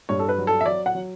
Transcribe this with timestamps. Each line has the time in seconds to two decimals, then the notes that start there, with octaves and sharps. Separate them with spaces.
0.09 G2 C#5
0.19 A4
0.29 B4
0.38 F#3
0.47 A4
0.61 E5
0.66 F#3 D5
0.86 F#5
0.95 F#3